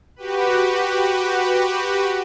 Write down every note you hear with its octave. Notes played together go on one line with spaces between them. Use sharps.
F#4 G4 B4